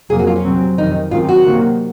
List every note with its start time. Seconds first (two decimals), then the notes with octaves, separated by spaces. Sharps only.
0.10 F2 C3 F#3 A#3 G#4
0.19 F#4
0.27 F4
0.36 C#4
0.45 C3 F#3 C4
0.78 F2 C3 D#3 D#4
1.11 F#2 D#3 G#3 C4 F4
1.29 F#4
1.45 C3 D#3 F#3 A#3